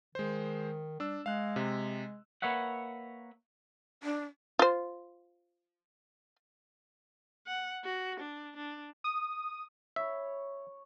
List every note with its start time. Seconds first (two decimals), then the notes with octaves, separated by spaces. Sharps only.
0.15 D#3 G#3 C5
1.00 G3 D4 E6
1.26 G#3 F5 F#6
1.56 C3
2.42 A#3 B4 C#5 E5 F#5
4.03 D4
4.59 F4 C5
7.47 F#5
7.84 F#4
8.20 D4
8.57 D4
9.04 D#6
9.96 C#5 E5 B5